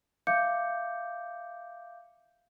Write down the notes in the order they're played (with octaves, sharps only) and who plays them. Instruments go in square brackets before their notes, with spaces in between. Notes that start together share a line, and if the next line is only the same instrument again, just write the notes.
[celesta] E5 F5 D6 G6 C#7